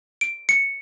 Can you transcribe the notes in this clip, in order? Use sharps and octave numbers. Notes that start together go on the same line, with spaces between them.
D7
C#7